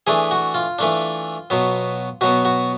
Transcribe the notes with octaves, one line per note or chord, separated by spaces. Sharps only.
E3 A3 D4 G#4
F#4
F4
E3 A3 D4
B2 F#3 B3
B2 F#3 B3 F#4
F#4